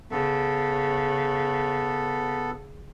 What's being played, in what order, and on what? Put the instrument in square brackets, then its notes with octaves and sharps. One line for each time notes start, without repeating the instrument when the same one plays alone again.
[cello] C#3 [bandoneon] B3 A4